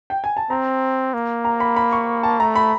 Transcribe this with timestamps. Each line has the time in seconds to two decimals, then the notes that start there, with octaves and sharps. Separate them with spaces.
0.10 G5
0.24 G#5
0.37 A5
0.50 C4 A#5
1.14 A#3
1.45 A#5
1.60 B5
1.76 B5
1.92 C#6
2.23 A5
2.40 A3 A#5
2.55 B5